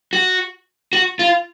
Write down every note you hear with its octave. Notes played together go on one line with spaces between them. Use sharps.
F#4
F#4
F4